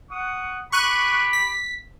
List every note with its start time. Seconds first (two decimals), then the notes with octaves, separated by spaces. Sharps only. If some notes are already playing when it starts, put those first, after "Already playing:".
0.11 F#5 C#6 D#6
0.72 G4 B5 C#6 F#6 D#7
1.33 B6